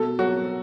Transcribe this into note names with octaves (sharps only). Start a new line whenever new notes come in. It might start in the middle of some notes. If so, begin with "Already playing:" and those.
Already playing: B2 A4
F#3 F#4